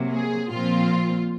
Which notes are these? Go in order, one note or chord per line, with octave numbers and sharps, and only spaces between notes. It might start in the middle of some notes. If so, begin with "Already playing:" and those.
Already playing: C3 F#3 A#3
G#4
A#2 F3 C4 F4